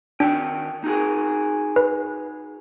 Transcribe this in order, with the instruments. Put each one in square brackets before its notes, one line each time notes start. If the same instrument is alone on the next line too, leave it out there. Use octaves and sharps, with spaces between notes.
[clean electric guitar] D#3 F#4 G5 [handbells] D4
[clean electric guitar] D#4 F#4 G#4
[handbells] B4